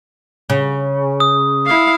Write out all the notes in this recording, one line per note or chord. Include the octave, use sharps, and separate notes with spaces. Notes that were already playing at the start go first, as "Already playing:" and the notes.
C#3
D#6
E4 F5